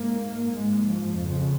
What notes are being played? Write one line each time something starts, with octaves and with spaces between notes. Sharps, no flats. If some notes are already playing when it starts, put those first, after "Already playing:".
Already playing: G#2 A#3
G#2 G#3
F3
F2 C#3